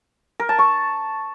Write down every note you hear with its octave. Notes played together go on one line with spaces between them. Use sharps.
A#4
A5
C#6